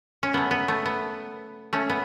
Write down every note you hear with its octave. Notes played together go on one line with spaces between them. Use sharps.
C#4
C#3 F#3 A3 B3
B3
A3
B3
A3 C#4
B3